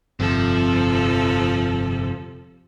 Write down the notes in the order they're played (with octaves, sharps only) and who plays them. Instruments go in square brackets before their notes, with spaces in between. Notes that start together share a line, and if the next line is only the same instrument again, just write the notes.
[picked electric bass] G1 F2 [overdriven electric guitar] C3 [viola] F3 A4